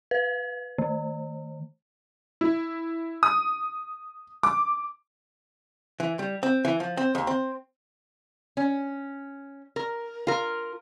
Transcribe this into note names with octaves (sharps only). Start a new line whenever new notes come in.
B4
D#3
E4
D#6
D6
E3
G3
C4
E3
F3
C4
D#2
C4
C#4
A#4
F4 A#4